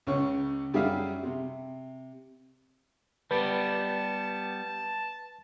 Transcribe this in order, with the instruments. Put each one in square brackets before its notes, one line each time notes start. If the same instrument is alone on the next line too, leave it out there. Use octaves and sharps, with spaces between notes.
[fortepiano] C#2 C#3 C#5 C#6
F#2 G3 G#4 E5 F5
C3
[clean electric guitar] G3 B3 G4 [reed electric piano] B4 [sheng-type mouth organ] A5